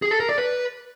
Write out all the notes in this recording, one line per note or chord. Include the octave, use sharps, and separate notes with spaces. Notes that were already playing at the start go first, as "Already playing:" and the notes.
G#4
A4
A#4
D5
B4